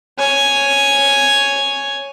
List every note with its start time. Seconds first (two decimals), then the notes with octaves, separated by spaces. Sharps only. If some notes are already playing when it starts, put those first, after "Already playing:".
0.19 C#5 G#5